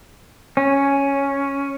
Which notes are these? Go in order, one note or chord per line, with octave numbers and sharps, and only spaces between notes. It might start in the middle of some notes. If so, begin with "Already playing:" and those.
C#4